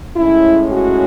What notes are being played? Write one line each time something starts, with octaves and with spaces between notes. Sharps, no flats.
A2 G#3 C#4 E4
F#4